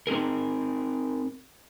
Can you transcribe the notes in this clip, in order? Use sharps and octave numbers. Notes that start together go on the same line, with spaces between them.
C4 D#4 G#4 A#4